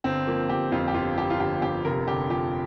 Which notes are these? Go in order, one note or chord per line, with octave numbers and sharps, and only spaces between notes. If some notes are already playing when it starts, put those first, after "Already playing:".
G1 C4
F3 A#3
G1 G4
F2 F4
G4
G1 F4
F3 G4
F4
G1 G4
F2 G4
F1 A#4
D3 G4
F3 G4